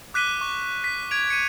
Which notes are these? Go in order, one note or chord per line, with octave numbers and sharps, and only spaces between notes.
D6 F#6 B6 D#7 G7
C#6
B6
G#6 D7 F7
C#7 D#7